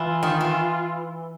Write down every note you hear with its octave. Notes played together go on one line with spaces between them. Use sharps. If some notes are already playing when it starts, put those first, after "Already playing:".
Already playing: E3 F4
D#3
E3